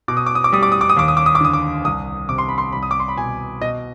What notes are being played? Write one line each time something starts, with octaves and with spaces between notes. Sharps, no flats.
B2 D6
D#6
D6
D#6
D6
G3 D#6
D6
D#6
D6
D#6
D#2 D6
D#6
D6
D#6
D6
D3 D#6
D6
C2 D#6
C3 D6
C6
B5
C6
C2 B5
D#6
D6
C6
B5
B2 G#5
B2 D#5